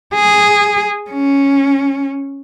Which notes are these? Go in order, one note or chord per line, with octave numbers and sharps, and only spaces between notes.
G#4
C#4